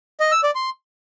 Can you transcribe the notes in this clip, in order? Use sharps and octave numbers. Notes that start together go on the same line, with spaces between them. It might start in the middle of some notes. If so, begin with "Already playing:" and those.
D#5
E6
D5
C6